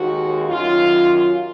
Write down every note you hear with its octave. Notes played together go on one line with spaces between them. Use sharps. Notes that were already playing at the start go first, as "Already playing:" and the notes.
Already playing: D#2 D#3 G#3 F#4
F#2 D#3 F#3 F4